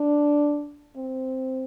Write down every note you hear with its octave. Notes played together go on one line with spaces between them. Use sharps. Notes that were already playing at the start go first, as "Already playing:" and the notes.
Already playing: D4
C4